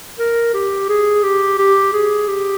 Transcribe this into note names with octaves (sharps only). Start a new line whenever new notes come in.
A#4
G4
G#4
G4
G4
G#4
G4